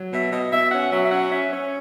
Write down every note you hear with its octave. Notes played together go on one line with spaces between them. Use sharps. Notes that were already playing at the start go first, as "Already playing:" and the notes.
Already playing: F#3
B2 E5
B2 D#5
B2 E5
C#4 F#5
F#3 E5
E5
C#4 F#5
C#4 E5
C#4